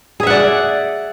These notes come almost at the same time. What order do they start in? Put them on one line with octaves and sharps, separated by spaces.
G#4 E5 F#5 D5